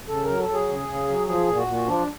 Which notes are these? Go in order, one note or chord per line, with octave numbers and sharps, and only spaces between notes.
C#3 A4
A#4
F#3
A4
F#3 G#4
C#3
C#3
F#3
F3 G#4
A#2
F#4
A#2
F3 D4